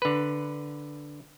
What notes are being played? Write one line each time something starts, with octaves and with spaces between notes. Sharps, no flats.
D3 B4